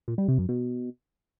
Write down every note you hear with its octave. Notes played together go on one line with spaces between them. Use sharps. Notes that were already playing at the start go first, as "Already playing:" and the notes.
A#2
G3
C3
F#2
B2